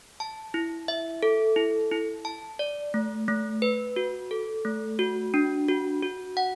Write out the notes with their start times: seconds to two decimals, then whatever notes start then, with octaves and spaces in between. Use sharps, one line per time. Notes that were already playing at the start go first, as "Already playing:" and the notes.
0.20 A5
0.54 E4
0.88 E5
1.23 A4
1.56 E4
1.91 E4
2.25 A5
2.59 D5
2.94 A3
3.28 A3
3.62 B4
3.96 F#4
4.31 A4
4.65 A3
4.99 F#4
5.34 D4
5.68 F#4
6.03 F#4
6.37 F#5